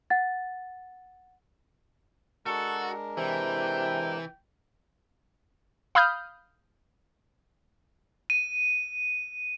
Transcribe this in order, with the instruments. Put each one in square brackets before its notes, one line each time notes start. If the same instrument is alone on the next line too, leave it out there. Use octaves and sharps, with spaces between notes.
[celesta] F#5 A6
[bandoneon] G#3 D4 A#4 [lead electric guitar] F#4 [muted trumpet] A4
[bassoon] C3 [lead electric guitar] E3 [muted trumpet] G5
[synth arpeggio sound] F5 B5 D#6 F6 G6
[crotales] D#7